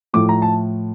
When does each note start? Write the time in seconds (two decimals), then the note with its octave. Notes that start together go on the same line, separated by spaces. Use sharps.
0.13 A2 F3 A3 D6
0.29 A#5
0.42 A5